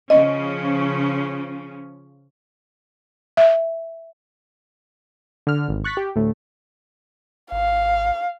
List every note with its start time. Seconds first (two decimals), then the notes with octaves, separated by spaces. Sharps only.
0.10 C#3 F3 C#4 D#5
3.37 E5
5.47 D3 F6
5.68 G#1
5.84 C#6 F#6 A6 B6
5.97 G4
6.16 D2 A2 A3
7.52 G#1 F5